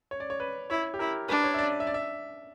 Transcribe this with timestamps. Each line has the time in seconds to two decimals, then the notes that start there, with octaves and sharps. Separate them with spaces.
0.11 C#5
0.20 D5
0.30 C#5
0.40 B4
0.70 E4 C#5
0.94 G4
0.99 E4 A#4
1.28 D4 B4
1.44 C#5
1.54 E5
1.58 D5
1.80 E5
1.87 D5
1.94 E5